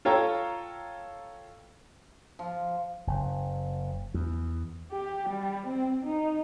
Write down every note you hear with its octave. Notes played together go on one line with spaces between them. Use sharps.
F4 A4 C#5 G5 A#5
F3
F#1
E2
G4
G3
C4
D#4